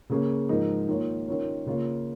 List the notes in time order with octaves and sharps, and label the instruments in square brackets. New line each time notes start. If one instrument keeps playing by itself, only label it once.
[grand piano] C#3 A#3 C#4 G#4
G#2 F3 G#3 D#4 A#4
D#3 A#3 F4 C#5
D#3 C#4 F4 A#4 C#5
C#3 A#3 F4 C#5